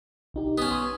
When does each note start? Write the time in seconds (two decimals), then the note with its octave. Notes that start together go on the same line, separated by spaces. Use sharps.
0.34 B1 D#4 G4
0.58 B3 C#4 D#6
0.71 C6 D#6